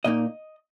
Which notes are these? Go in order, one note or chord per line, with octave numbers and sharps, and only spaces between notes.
A#2 A#3 D#4 D#5